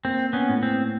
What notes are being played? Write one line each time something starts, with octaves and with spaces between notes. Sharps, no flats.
A#3 C4
B3 C#4
A2
C4